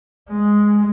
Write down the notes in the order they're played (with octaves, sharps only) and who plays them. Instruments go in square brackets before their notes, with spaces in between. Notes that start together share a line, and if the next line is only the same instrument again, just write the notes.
[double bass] G#3